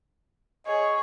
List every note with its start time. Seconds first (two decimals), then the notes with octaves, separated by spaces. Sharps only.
0.66 G#4 C#5 D#5